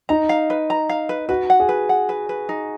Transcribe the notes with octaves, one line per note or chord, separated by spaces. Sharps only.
D#4 A#5
F5
B4
A#5
F5
B4
F#4 B4
F#5
G#4
B4
F#5
B4
B4
D#4